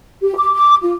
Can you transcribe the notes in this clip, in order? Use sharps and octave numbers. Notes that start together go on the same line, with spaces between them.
G4
D6
D6
F4